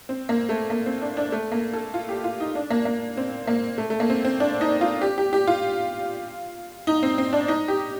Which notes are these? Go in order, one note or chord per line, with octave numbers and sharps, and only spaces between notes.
C4
A#3
A3
A#3
C4
D4
D4
A3
A#3
A4
F4
G4
F4
D#4
D4
A#3
A#3
C4
A#3
A3
A3
A#3
C4
C4
D4
D#4
F4
G4
G4
G4
F4
D#4
C4
C4
D4
D#4
G4